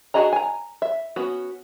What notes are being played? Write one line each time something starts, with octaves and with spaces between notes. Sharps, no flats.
D4 F#4 G#4 D#5 A#5
G#5 A#5
E5
B3 C#4 F#4